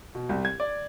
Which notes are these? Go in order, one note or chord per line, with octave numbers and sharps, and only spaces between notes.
B2
C2
G#6
D5